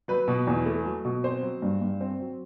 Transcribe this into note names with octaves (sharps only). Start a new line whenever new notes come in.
F#3 B4
B2
E2
A3
F#3
B2
C4 C5
F#3
G2
G2
C4
F#3